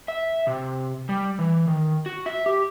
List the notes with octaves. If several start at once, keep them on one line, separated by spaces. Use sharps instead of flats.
E5
C3
G3
E3
D#3
F#4
E5
G4